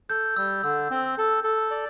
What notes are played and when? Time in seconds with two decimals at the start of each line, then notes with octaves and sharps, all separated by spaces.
0.10 A4 G6
0.36 G3 E6
0.63 D3 E6
0.91 C4
1.18 A4
1.44 A4
1.71 D5